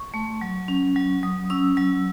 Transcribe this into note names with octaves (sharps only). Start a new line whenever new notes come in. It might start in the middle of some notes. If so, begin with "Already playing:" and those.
Already playing: C#6
A3
F#3
C#4
F#3
F#3 D#6
C#4 E6
F#3 E6